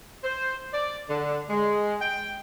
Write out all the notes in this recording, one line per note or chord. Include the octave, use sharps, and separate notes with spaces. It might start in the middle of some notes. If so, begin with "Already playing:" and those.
C5
D5
D3
G#3
G5